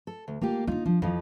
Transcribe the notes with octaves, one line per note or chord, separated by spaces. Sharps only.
A4
D2
A3 A#3 F4 G4
A#3 D4 D#4 F4
F3 D4
F2 E3 F3